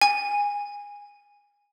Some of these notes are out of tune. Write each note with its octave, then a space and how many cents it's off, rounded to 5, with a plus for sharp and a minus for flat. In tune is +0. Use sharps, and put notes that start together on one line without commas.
G#5 -20